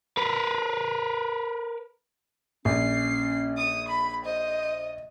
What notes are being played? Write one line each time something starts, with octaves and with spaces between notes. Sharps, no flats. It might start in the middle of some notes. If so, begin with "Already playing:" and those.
A#4 B4
A#1 C#4 C7
D#6
B5
C5 D#5